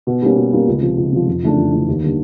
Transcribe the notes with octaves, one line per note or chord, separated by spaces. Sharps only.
B2
G3 A#3 C#4
B2
G3 A#3 C#4
C#2
C3 F3
C#2
C3 F3
F2
C#3 E3 A3 D4
F2
C#3 E3 A3 D4
D#2
D3 G3 A#3 D4